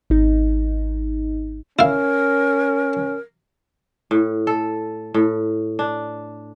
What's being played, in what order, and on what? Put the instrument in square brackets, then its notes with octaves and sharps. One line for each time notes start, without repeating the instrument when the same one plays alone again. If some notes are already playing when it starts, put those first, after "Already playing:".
[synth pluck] G#1 D#4
[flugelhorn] C#4 [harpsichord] E4 F5 [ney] A#4
[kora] A2
A4
A2
D4